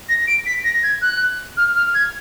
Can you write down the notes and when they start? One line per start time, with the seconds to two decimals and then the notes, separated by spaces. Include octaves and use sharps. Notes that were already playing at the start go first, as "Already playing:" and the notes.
0.08 A#6
0.27 D7
0.46 B6
0.64 A#6
0.83 G#6
1.01 F#6
1.57 F6
1.75 F6
1.94 G#6